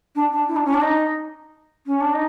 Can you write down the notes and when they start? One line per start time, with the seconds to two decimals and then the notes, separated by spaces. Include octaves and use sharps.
0.15 D4
0.32 D4
0.48 E4
0.56 D4
0.65 C#4
0.74 D4
0.82 D#4
1.87 C#4
2.01 D4
2.13 D#4